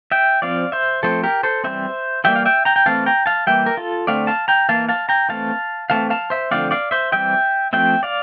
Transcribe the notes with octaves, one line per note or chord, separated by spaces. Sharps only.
E5 G5
F3 C4 D5 F5
C5 E5
F3 A3 C4 A4 C5
G4 A#4
A4 C5
E3 G3 C4 C5 E5
E3 G3 A#3 E5 G5
F5
E5 G5
G5 A#5
G5
E3 A3 C4 F5 A5
G5 A#5
F5 A5
E3 G3 A#3 E5 G5
A#4
F4 A4
D3 A3 C4 D5 F5
F5 A5
G5 A#5
E3 A#3 F5 A5
F5 A5
G5 A#5
E3 A3 C4 F5 A5
E3 A3 C4 F5 A5
F5 A5
C5 E5
D3 F3 A3 C4 D5 F5
D5 F5
C5 E5
E3 G3 C4 E5 G5
F3 A3 C4 E5 G5
D5 F5